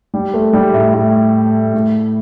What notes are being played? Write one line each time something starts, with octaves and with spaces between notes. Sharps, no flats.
G3
A3
G3
A2
A2
A2